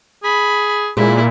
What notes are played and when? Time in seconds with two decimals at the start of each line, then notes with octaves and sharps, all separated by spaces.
0.24 G#4 B5
0.97 A#2 G#3 E4 G#4